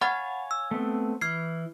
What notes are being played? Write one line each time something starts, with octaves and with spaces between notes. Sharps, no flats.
C#5 F5 F#5 G#5 B5 A6
E6
A3 B3 C4
E3 F6 G#6 C7